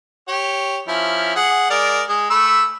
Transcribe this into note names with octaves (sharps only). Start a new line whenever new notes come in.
G4 C#5
F3 C#4 E4
G#4 F#5
G#3 A#4 D5
G#3
A3 B5 E6